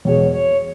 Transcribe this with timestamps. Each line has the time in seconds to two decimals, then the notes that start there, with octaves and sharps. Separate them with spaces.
0.05 E2 B2 G#3 C#5
0.32 C#5